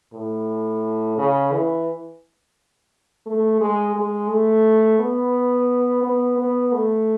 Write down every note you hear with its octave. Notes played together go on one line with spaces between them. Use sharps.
A2
C#3
E3
A3
G#3
G#3
A3
B3
B3
B3
A3